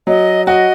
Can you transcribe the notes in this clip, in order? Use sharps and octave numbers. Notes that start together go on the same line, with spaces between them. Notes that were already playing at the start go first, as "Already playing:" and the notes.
F#3 D#5
F#4 D#5